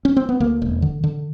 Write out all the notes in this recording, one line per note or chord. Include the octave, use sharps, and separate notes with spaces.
C#4
C4
B3
D2 A#3
E1
D3
D3